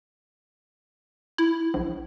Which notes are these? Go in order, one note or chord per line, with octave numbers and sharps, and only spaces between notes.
E4
A#1